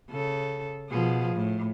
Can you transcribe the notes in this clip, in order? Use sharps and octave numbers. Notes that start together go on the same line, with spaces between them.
C#3 A4
B2 F3 G#4
A2